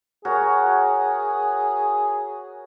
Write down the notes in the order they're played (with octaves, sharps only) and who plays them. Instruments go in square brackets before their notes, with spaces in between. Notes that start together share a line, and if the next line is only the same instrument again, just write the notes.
[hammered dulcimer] F#4 A#4 C#5 [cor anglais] G#4